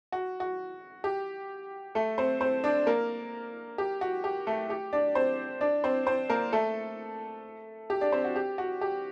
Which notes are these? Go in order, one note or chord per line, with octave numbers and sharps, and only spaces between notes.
F#4
F#4
G4
A3 A4
C4 C5
C4 C5
D4 D5
A#3 A#4
G4
F#4
G4
A3 A4
G4
D4 D5
C4 C5
D4 D5
C4 C5
C4 C5
A#3 A#4
A3 A4
G4
D4 D5
C4 C5
F#4
G4
F#4
G4